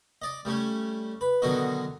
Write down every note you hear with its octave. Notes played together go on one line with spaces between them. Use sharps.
D5 D#5
G3 A3 C#4
B4
B2 D3 D#3 F#3 F#4 D#5